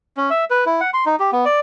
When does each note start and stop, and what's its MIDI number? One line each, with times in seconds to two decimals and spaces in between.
0.17 0.30 61
0.30 0.45 76
0.50 0.64 71
0.66 0.81 64
0.81 0.90 78
0.94 1.05 84
1.06 1.16 63
1.20 1.30 67
1.33 1.45 59
1.45 1.60 74